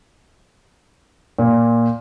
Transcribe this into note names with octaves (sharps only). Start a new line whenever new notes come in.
A#2